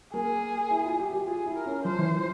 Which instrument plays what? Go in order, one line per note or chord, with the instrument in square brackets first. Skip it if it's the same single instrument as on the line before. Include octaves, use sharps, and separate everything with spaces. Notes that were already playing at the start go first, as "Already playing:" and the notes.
[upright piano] A#3 [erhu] G#4
[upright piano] E4
F4
G4
G4
[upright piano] F4 [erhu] G#4
[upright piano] E4
[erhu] A#4
[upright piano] C#4
[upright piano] F3 [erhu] C5
[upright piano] E3
F3